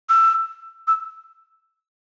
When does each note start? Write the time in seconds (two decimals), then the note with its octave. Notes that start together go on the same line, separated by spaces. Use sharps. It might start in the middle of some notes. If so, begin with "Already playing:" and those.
0.09 E6
0.88 E6